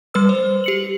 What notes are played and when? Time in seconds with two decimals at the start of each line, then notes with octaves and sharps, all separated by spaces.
0.14 G3 B4 E6
0.29 C5
0.64 G4 C#7 F#7